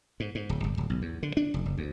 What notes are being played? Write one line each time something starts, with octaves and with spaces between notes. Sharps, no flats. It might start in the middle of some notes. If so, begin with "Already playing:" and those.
G#2
G#2
D1
G1
D1
B1
E2
D3
D4
F1
F#1
D2